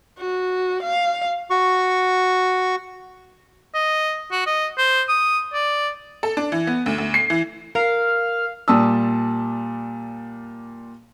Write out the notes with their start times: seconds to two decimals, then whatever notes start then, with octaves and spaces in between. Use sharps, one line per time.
0.18 F#4
0.83 F5
1.50 F#4 C#6
3.74 D#5
4.32 F#4
4.46 D#5
4.78 C5
5.09 D#6
5.54 D5
6.23 A4
6.37 D4
6.52 E3
6.67 B3
6.86 D2
6.98 D2
7.14 C7
7.30 E3
7.75 A#4 F5
8.68 A#2 G3 D5 A5 D#6 E6